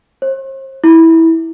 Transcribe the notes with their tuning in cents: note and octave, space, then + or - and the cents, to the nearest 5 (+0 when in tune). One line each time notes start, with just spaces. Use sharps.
C5 +45
E4 -15